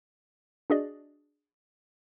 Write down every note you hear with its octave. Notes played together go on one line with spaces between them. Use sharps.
D4 F#4 G#4 D5 D#5